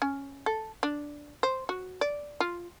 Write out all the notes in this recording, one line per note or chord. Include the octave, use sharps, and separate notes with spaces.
C#4
A4
D4
C5
F#4
D5
F4